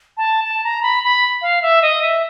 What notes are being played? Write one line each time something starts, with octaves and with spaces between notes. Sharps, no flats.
A5
A5
A#5
B5
B5
F5
E5
D#5
E5